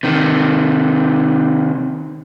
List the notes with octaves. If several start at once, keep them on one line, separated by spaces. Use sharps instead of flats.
C3 D#3